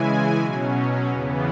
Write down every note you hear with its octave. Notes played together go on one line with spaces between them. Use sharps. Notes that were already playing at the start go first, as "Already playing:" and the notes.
Already playing: C#3 E3 G#3 E4 G#5
B2 F#3 C#4
E2 C#3 E3 B3